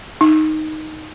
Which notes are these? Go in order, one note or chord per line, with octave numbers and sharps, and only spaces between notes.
D#4